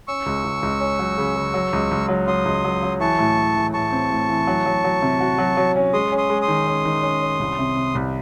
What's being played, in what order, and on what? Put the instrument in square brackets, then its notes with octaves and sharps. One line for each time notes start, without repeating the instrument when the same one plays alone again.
[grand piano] C#4 [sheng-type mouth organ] C#6 E6
[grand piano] C#2
C#2
C#2
C#4
F#3
C#3
C#3
F#3
C#2
C#2
F#3
[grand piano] F#3 [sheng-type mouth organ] C6 D#6
[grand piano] C#2
F#3
F#3
[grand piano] E3 [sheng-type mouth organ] A5 C#6
[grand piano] A2
E3
E3
[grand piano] A2 [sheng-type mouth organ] A5 C#6
[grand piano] C4
A2
E3
F#3
F#3
F#3
C3
F#4
F#3
F#3
C#4
[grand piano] G#3 [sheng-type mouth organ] C6 D#6
[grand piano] C#4
[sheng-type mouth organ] C6 D#6
[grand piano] G#3
[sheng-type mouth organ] C6 D#6
[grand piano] D#3
C#4
D#3
C#4
C#4
C2
C3
C3
C2